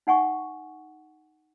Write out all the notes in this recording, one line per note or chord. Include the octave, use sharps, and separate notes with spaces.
D#4 F#5 G#5 C#6